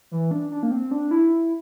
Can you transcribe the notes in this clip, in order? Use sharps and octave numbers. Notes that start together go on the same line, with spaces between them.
E3
D4
D4
A#3
C4
D4
E4